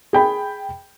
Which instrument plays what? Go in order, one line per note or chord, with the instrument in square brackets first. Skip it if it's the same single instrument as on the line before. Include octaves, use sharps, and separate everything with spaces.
[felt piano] G#4 G5 B5